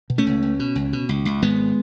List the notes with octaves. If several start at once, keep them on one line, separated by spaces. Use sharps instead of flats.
B2
A3 C#4
C#2
C#2
B2
C#2
B2
C#2
C#2
G#1 G#3 B3